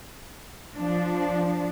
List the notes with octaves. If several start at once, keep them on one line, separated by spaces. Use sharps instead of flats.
F3 D4